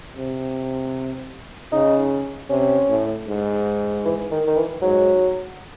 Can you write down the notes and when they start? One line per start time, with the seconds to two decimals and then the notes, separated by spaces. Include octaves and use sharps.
0.17 C3
1.72 C#3 D#4
2.50 C3 C#4
2.89 A2
3.27 G#2
4.05 E3
4.31 D#3
4.47 D#3
4.57 E3
4.82 G#2 F#3